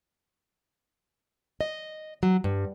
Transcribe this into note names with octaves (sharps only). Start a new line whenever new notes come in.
D#5
F#3
G2